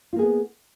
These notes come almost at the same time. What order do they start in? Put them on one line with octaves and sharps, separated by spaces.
F4 A#3 G#4 B3